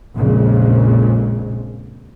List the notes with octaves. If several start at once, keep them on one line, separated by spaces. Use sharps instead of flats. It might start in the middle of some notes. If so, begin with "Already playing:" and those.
A#1 F2 A#2 C#3 G#3